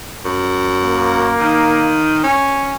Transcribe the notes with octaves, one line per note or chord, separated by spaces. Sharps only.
F#2
A#3
D#3
C#4